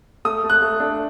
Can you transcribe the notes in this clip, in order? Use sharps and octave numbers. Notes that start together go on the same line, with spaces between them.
A3 D#6
A3
F#6
A3
D4